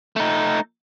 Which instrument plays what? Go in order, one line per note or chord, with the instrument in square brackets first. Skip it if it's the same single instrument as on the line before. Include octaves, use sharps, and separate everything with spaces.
[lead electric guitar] A3 D#4